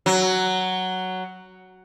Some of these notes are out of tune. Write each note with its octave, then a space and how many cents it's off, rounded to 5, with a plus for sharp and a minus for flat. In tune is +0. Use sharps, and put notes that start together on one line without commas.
F#3 +5